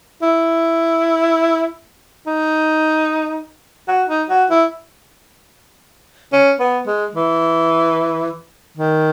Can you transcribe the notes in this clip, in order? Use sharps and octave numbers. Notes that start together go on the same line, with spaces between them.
E4
D#4
F#4
D#4
F#4
E4
C#4
B3
G#3
E3
D#3